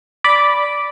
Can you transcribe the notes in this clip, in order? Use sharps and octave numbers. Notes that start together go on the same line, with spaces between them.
D5 B5 D6